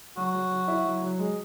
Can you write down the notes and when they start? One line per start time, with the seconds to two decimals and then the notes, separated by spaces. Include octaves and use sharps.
0.17 F#3 F#4
0.34 F#3
0.52 F#3
0.68 E4
0.85 F#3
1.02 F#3
1.19 G#3